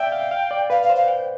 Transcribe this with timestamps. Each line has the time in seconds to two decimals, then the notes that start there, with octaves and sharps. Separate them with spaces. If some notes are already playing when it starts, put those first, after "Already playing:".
Already playing: D5 E5 G5
0.12 F5
0.31 F5
0.51 D5
0.70 B4 F5
0.83 F5
0.89 C5
0.96 F5
1.08 G5